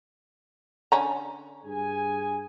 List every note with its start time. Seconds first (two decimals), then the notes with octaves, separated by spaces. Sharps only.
0.92 D3 C#4 A#5
1.64 G2 G#4 G#5